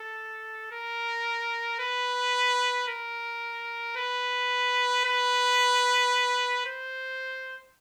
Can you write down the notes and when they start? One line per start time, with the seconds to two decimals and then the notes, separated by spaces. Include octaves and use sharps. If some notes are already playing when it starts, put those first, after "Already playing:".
Already playing: A4
0.72 A#4
1.79 B4
2.88 A#4
3.96 B4
5.04 B4
6.66 C5